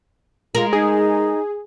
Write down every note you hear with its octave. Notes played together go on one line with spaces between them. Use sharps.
G#3 F4 A#4
D#4 G#4